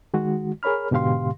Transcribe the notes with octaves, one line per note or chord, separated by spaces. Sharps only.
D#3 G#3 F#4
G#4 A#4 C#5 B5 F6
G#2 B2 D3 G4 F5 C6